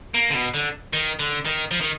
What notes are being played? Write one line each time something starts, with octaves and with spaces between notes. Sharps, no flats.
A#3
D3
B2
D3
D#3
D3
D#3
F3
D#3